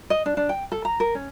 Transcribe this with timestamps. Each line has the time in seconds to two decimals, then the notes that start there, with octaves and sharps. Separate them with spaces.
0.10 D#5
0.26 D4
0.37 D4
0.49 G5
0.72 A4
0.85 A#5
1.00 A#4
1.15 C#4